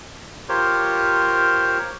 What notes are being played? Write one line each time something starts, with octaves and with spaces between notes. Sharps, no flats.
F4 G4 A#4 C5 C#5